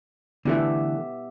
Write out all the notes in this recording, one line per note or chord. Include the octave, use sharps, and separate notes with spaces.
D3 E3 A3 B3 G4 E5